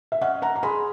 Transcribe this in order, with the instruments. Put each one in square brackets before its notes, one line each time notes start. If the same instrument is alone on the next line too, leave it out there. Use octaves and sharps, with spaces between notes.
[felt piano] E5
[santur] C#4 [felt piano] D#5 F#5
[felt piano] F#5 A#5
A#5
[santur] G#3 [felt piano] G#5 B5